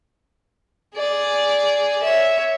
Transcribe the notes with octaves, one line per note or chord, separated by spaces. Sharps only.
G#4 D5
C#5 E5